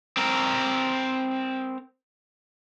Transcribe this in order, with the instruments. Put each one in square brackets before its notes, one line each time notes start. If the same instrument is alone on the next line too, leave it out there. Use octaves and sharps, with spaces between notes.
[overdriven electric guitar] C4 A#4